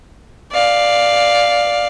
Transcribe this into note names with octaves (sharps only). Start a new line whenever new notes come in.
D5 F5